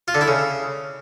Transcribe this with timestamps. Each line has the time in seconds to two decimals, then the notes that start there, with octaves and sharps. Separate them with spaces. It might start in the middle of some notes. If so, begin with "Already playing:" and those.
0.08 F4
0.14 D3
0.21 E4
0.28 C#3